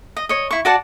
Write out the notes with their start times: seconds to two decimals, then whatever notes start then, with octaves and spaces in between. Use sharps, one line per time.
0.17 D#5
0.29 C#5 D#5
0.51 E4 C#6
0.65 F#4 D5 F#5 A5